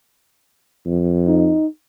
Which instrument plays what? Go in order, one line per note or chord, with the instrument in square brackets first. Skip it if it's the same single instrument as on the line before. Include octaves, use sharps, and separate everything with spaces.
[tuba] F2
[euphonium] D#4